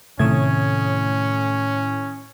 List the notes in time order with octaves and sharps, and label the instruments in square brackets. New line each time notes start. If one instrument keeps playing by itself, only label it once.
[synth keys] A2 [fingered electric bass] C3 [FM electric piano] D#3 D#6 G#6 [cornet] C#4